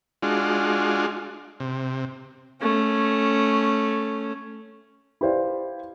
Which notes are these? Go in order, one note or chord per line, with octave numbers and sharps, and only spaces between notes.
G#3 D4 F4 F#4
C3
A3 C#4
E4 G4 B4 C5 D5 F5